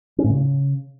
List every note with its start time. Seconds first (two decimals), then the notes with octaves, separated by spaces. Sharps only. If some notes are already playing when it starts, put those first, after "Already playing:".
0.18 C#4
0.24 A2
0.30 C#3